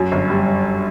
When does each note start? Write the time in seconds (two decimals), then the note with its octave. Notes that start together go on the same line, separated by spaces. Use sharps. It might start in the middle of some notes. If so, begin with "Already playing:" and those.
Already playing: F#2
0.12 G1
0.30 G3